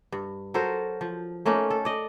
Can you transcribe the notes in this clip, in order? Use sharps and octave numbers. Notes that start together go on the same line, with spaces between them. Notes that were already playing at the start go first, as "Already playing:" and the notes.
G2
F#3 A4 A#4 C5
F3
A3 A#3 C#4 D#4
A4
D5 D#5